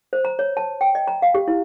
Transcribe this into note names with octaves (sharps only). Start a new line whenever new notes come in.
C5
A#5
C#5
A5
G5
D#5
A#5
F5
G4
E4